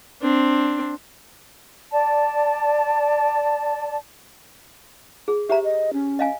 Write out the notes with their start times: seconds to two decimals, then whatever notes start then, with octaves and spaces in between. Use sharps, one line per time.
0.22 C4 D4
1.92 D5 A5
5.28 G#4
5.49 G4 C5 E5 A#5
5.64 D#5
5.93 C#4
6.19 D#5 F5 G#5